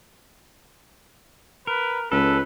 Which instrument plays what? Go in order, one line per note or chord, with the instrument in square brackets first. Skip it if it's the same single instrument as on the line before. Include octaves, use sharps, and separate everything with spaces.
[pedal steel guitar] A#4 [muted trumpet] B4
[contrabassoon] C#2 [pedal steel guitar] A4 [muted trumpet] B4